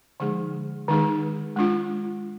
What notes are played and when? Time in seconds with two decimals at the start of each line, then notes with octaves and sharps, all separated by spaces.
0.20 D3 F3 G#3 D#4 G#4
0.88 D#3 G#3 D#4 G#4
1.57 G#3 D4 F4